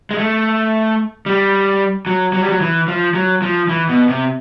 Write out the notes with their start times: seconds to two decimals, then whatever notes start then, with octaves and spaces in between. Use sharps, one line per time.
0.11 G#3
0.18 A3
1.26 G3
2.06 F#3
2.33 F#3
2.42 G3
2.49 F#3
2.61 E3
2.88 F3
3.14 F#3
3.42 F3
3.69 E3
3.89 B2
4.09 C3